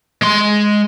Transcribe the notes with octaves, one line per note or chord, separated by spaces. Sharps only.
G#3 C6